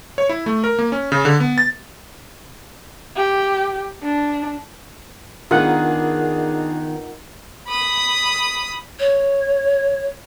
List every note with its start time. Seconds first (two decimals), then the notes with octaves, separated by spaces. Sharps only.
0.18 C#5
0.29 E4
0.46 A3
0.64 A#4
0.79 A#3
0.92 C#4
1.12 C#3
1.25 D3
1.40 B3
1.58 A6
3.16 G4
4.03 D4
5.51 D#3 B3 D4 D#4 F4 G#4 A#4 F#5
7.68 B5 D#6
8.99 C#5